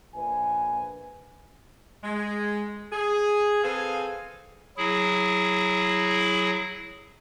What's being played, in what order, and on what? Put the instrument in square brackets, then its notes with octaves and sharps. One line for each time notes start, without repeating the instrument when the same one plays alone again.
[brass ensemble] A#1 B4 G#5
[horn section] G#3
G#4
C4 G#4 A4 B4 F5 G#5
[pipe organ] F#3 E4 G#4